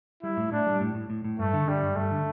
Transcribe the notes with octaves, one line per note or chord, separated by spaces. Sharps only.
G3 E4
A2
A2 D4
G3
A2
A2
A2
A2
G2 A3
D3
D3 G3
G2
G2 A3
D3